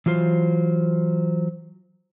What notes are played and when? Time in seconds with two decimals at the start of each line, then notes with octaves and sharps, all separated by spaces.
0.06 E3 F#3 F4 C5